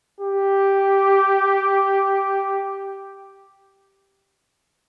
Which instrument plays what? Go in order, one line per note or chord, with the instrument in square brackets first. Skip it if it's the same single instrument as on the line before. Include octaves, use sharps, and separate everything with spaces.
[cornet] G4